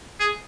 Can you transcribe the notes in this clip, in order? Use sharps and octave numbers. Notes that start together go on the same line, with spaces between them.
G#4